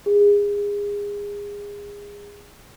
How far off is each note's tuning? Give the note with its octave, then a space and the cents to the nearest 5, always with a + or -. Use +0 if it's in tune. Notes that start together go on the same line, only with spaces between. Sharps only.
G#4 -30